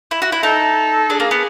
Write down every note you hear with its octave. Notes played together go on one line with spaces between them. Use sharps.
E4
F#4
E4
D#4 A4
D4 G#4
A#3
B3